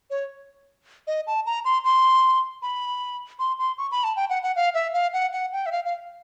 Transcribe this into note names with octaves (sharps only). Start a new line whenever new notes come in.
C#5
D#5
A5
A#5
C6
C6
B5
C6
C6
C#6
B5
A5
G5
F#5
F#5
F5
E5
F5
F#5
F#5
G5
E5
F5
F5